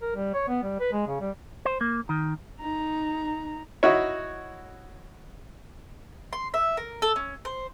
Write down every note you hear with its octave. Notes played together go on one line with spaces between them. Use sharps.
A#4
G3
C#5
B3
G3
B4
G#3
C#3
G3
C5
A#3
D#3
D#4 A#5
D#4 E4 F#4 C#5
C6
E5
A#4
A4
C#4
C5